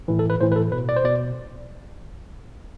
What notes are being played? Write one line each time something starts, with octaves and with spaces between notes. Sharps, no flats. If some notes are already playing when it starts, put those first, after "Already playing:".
A2 E3
A4
B4
A2 E3 C5
B4
A4
B2 B4
D5
C5
B2 D5